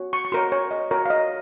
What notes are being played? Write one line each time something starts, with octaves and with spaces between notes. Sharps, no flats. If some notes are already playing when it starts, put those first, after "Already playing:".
Already playing: F#4 C#5
C#6
C#6
F#4 A#4 C#5 C6
C#5
D#5
F#4 A#4 C#5
F5
D#5